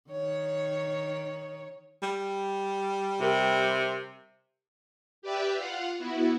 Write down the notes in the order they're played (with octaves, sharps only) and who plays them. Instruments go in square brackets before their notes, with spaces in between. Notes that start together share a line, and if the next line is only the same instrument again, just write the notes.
[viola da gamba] D#3 C#5
[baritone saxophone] G3
[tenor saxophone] C3 [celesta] G4 A#4
[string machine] G4 B4 D5 E5 G5
F4 F5 F#5
B3 E4 F#4